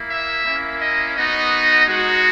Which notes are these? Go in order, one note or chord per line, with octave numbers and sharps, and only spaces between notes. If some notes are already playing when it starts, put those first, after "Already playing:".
Already playing: A#3 E4
E5
A#3 C#4 E4
D#5
B3 D#4 F#4 D#5
G#3 D#4 F#4